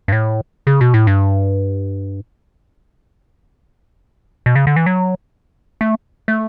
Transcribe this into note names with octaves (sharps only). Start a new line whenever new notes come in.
G2
A2
C#3
B2
A2
G2
B2
C#3
D3
E3
F#3
A3
A3